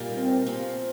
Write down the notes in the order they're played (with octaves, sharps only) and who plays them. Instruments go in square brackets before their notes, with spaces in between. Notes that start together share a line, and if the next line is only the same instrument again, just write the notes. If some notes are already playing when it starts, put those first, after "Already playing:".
Already playing: [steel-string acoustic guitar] A#2 G3 A#3 D#4
[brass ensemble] C4
[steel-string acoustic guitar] A#2 F3 C4